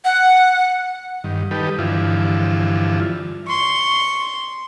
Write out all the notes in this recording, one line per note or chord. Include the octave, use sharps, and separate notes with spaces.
F#5
G2 D#3
D#3 G3 D#4 G4 A4 B4
G2 D3 E3 F3 E4 F4
C6 C#6